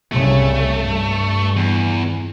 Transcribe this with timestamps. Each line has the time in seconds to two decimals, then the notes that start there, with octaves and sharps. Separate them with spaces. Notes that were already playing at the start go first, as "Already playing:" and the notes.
0.12 C2 C#3 A3
0.81 G2
1.56 E2